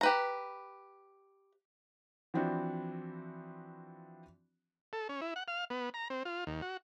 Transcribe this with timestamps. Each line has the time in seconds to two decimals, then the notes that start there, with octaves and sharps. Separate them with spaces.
0.01 G4 B4 A#5
2.34 E3 F3 C4 D4 E4 F#4
4.93 A4
5.09 C#4
5.21 E4
5.36 F#5
5.48 F5
5.70 B3
5.94 A#5
6.10 C4
6.25 F4
6.47 D#2
6.62 F#4